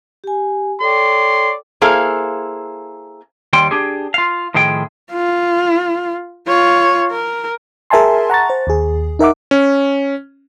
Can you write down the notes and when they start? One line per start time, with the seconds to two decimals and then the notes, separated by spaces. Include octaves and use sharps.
0.24 G4 G#5
0.81 A4 C#5 D5 G5 C6
1.82 A#3 E4 G#4 A4 C5 F5
3.53 D#2 G3 G5 C6
3.71 D4 G4 G#4
4.14 F4 F5
4.54 A2 D#3 F3 G#4 G5
5.12 F4
6.48 F4 C#5
7.11 A#4
7.90 G#4 A#4 E5 G#5 A5 C6
8.30 F#5 A#5 C#6 A6
8.50 C5
8.67 D#2 G#4
9.19 D#4 A#4 E5 F#5 D6
9.51 C#4